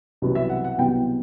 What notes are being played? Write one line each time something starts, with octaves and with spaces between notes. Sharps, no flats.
C2 B2 F#3 B3
E5
F#5
F#5
C2 B2 F#3 B3 G5